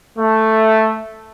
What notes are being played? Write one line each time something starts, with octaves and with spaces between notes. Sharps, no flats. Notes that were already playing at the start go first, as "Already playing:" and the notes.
A3